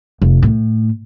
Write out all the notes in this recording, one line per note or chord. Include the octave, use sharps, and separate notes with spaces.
F1
A2